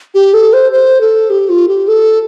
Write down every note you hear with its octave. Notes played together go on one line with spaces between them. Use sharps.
G4
A4
C5
C5
A4
G4
F4
G4
A4